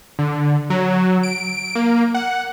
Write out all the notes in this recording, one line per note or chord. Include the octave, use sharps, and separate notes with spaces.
D3
F#3
D7
A#3
F#5